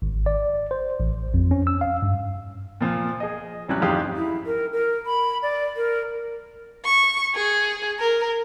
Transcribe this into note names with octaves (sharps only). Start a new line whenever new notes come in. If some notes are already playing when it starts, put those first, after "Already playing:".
G#1
D5
C5
A1
F2
C#4
E6
F5
G2
A#2 F3
G#4 D#5
A1 F#3 G3 C#4 F#6
F2 G#2 G#3 G4 F5 D#6
E4
A#4
A#4
B5
D5
A#4
C#6
G#4
A#4